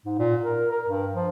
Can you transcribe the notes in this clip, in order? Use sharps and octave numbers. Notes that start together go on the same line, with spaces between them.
G#2
A#2
A#4
A#4
G2
F3